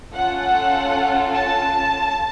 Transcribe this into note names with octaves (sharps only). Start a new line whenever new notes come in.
C#4 F4 A4 F#5
A5